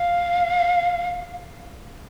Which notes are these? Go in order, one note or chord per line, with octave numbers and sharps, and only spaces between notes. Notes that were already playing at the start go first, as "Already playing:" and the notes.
Already playing: F5